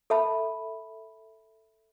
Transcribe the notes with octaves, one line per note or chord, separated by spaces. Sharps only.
A4 E5 A5 B5